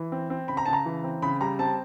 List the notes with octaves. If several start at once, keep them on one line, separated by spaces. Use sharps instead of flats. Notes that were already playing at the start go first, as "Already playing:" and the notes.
Already playing: E3
C4
C4
C#3 B5
A#5
C#3 A5
A#5
E3
C4
C#3 B5
G3 A#5
C4 A5